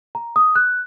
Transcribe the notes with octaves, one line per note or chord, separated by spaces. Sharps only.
A#5
D#6
F#6